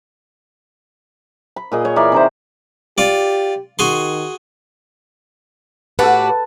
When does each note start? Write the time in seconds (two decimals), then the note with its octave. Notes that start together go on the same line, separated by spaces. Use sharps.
1.56 B5
1.72 A#2 G#4 D#5
1.85 C#5 C#6
1.96 E3 A#4 D5 B5
2.12 C3 D#4 C5
2.98 F4 G4 D5
3.79 D#3 F#4 G#4 C6
5.99 A2 F#4 G4 A4 B4 A5